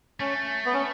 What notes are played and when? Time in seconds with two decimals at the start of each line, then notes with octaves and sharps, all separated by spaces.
0.20 A3 C#4
0.65 B3
0.74 C#4